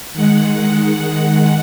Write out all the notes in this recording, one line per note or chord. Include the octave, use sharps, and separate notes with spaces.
D#3 G#3 F#5